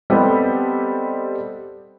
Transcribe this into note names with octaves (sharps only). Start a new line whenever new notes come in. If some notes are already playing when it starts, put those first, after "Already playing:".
G3 B3 C4 G4 A4 D#5